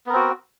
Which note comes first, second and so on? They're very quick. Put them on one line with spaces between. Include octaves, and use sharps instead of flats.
B3 A#4 C4 F#4